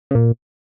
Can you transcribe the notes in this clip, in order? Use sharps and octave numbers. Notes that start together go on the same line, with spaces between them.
C#3
A#2